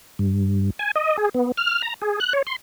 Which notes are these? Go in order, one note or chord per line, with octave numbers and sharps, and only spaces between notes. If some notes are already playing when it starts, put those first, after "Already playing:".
G2
G#5
D#5
G#4
B3
F6
A#5
G#4
F#6
C#5
C6